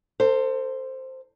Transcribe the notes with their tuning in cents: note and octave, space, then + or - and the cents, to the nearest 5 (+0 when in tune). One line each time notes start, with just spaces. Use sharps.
A4 +40 C5 +0